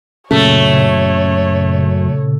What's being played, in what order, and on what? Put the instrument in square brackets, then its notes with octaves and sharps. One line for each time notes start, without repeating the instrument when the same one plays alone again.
[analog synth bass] F#2 [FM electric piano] A#2 C#3 [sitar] A3 [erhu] C#5